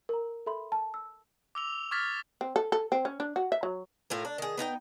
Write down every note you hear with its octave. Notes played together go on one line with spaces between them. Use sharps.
A#4 A#5
A4 E5 B5 C6
A5
E6
D6 E6 F7
C#6 D6 F6 G#6 A6 B6
C4
A4
A4
C4
C#4
D4
F#4
E5
F#3
A2 F4 A#4
D4
D#3 G#4
B3 D#4 F5 G5